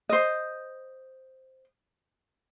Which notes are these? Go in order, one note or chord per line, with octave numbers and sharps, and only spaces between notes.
C5 D#5